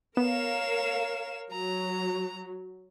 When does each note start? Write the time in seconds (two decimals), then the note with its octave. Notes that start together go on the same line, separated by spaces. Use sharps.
0.17 B3 A#4 C#5 F5 E7
1.52 F#3 A#5